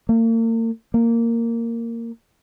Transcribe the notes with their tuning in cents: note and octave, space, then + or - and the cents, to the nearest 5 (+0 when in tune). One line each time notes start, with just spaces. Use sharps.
A#3 -40
A#3 -10